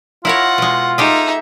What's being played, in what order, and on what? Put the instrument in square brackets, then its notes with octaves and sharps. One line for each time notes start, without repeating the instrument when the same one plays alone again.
[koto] E4 A#4 C#5 [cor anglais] F4 [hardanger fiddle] F#5
[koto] B2 G#3
[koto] A3 G4 G#4 [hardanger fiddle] D#4 E5